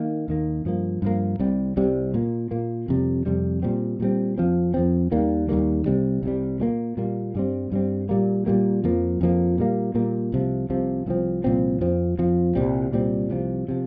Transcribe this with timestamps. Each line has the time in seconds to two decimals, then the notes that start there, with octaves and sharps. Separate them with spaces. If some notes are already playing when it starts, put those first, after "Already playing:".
Already playing: D#3 A#3
0.28 D#2 D#3 A#3
0.65 G2 F3 A#3
1.02 G2 F3 A#3
1.39 C2 C3 G3
1.77 C2 C3 G3
2.14 A#2 A#3
2.51 A#2 A#3
2.88 F2 C3 G3
3.26 F2 C3 G3
3.63 A#2 G3 C4
4.00 A#2 G3 C4
4.38 F2 F3 C4
4.74 F2 F3 C4
5.11 D#2 D#3 G3 A#3
5.49 D#2 D#3 G3 A#3
5.86 C2 C3 G3
6.23 C2 C3 G3
6.60 A#2 G3 A#3
6.97 A#2 G3 A#3
7.35 G2 G3 C4
7.72 G2 G3 C4
8.09 A#2 G3 A#3
8.46 A#2 G3 A#3
8.84 F2 F3 A#3
9.21 F2 F3 A#3
9.58 A#2 G3 A#3
9.95 A#2 G3 A#3
10.32 C2 C3 F3
10.70 C2 C3 F3
11.06 C2 A#2 F3 C4
11.44 C2 A#2 F3 C4
11.81 F2 F3 C4
12.18 F2 F3 C4
12.55 C2 A#2 G3 C4
12.93 C2 A#2 G3 C4
13.30 C2 C3 F3
13.68 C3 F3